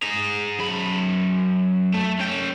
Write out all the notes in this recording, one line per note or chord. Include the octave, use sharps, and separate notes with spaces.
G#4 A#5
F#2 B5
A3
C#4 G5